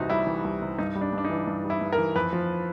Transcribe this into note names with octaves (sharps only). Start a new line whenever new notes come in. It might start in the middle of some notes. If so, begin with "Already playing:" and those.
Already playing: C2 C3 E3 D#4 F#4
G3 E4
E3
C2
C3
G2 D#4
G3
D4
G2
D4
D#4
E3
G2
G3
E4
G2
A#4
E3
F2 B4
F3